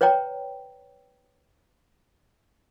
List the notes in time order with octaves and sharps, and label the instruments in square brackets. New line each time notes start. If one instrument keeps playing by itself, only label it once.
[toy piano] B4 C#5 D5 G5 A#5